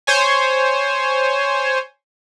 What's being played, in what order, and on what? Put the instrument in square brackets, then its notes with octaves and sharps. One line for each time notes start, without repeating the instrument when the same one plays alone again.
[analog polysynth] C5 C#5 G#5